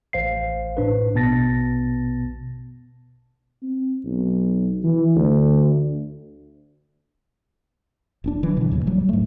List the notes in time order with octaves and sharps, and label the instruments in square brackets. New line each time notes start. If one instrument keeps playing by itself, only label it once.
[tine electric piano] A1 C5 F5 C7
A2 D4 B4
A#1 B2 B3 A5 A6 A#6
[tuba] C4
B1
E3
D2
[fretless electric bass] D#1 C4 D4
D3 E3 F#3
B2 D3
D#2 A2 E3 A#3
D1 G2 F#3 G3
G#2 A3